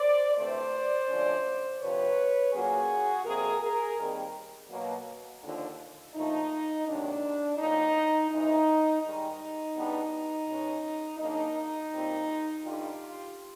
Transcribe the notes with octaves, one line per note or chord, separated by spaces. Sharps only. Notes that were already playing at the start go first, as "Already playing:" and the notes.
Already playing: C5 D5
D2 C3 E3 A3 C5 D5
D2 D3 F3 G#3 C#4
D2 C3 F3 B4 C#5
A#2 F#3 A#3 C#4 F#4 G#4
F2 C3 F3 A#3 G#4 A#4
G#4 A#4
D#2 D#3 G3 C4
B2 F#3 A#3
D#2 D3 F3
A#2 F3 A3 D4 D#4
D2 C3 D#3 F#3 A#3 D4
A2 F3 A#3 C#4 D#4
D2 C#3 E3 G#3 D#4
G#2 D#3 G3 D#4
E2 B2 G3 B3 D4
B2 G#3 C#4
C#3 F#3 A#3 D4 D#4
A#2 G3 C4
G2 D3 G3 F4 G4